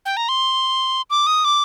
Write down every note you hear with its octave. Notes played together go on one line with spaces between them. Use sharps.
G5
A#5
C6
D6
D#6
D6